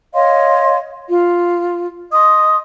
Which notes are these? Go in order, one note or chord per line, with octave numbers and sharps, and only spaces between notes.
C#5 D#5 F5 C6
F4
D#5 C6 D#6